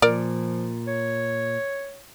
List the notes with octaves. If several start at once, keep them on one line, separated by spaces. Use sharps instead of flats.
A#2 F3 A#4 D5
C#5